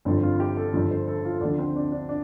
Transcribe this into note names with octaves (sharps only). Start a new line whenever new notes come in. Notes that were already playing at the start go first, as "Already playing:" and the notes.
G1 G2 F3 C4
F4
G4
A4
G1 G2 F3 A4
C5
A4
F4
D2 D3 F3 D4
C4
D4
D4
D4